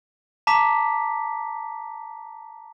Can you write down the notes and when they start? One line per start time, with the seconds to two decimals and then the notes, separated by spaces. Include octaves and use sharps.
0.47 A5 A#5 D6 B6